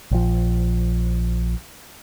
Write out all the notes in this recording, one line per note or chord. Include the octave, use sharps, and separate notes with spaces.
A#1 F3